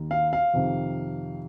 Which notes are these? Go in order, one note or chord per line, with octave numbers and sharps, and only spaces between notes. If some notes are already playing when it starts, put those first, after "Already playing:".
Already playing: D#2 D#3
F5
F5
F2 C3 D#3